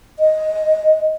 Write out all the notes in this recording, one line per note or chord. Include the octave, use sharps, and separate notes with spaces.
D#5